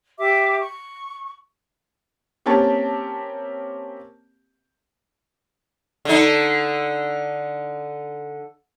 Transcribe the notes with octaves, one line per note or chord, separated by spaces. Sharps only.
G4 E5 D6
C#6
A#3 C4 C#4 G4 A5
D3 D#4